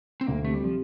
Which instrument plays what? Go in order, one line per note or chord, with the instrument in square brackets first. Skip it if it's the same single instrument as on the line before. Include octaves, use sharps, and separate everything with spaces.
[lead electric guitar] C4
[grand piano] D2 [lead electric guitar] A#3
[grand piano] C3 [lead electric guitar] A3
[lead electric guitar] G3
[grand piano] C3 [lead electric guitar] F3